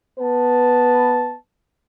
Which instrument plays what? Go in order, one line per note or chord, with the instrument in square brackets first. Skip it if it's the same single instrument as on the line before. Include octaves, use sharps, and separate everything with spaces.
[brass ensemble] B3 B4 A5